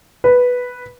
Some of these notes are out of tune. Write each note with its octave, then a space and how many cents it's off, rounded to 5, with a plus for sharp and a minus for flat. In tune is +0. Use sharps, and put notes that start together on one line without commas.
B4 +0